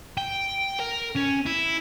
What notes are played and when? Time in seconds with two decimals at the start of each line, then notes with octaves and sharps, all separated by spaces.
0.17 G5
0.79 A#4
1.15 C#4
1.46 E4